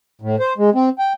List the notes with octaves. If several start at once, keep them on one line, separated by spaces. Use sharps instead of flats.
A2
C5
G#3
C4
G5